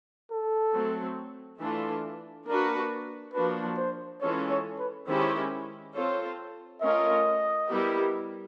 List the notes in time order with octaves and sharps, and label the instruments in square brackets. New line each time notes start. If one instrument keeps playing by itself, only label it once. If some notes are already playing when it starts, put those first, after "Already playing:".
[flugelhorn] A4
[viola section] F#3 A3 C4
E3 A3 D4 F4 A4
[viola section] A#3 D4 F#4 B4 [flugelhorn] A#4
[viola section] F3 A#3 D4 F#4 [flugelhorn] B4
[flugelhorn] C5
[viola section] E3 G#3 C#4 F4 A4 [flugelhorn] C#5
[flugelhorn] C#5
B4
[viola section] D#3 G#3 C#4 E4 G4 [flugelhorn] C5
[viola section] C4 F4 A4 C5 [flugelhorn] C#5
[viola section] A3 C#4 F4 A#4 [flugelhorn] D#5
[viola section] G3 B3 E4 G4 A#4